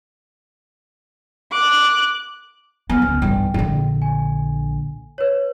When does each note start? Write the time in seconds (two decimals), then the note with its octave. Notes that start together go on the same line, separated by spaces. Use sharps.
1.52 D6 F#6
2.90 B3 G#5 F6
3.02 C#2
3.22 B1 G2 G5
3.54 A#1 D3
4.02 G#5
5.18 B4 C#5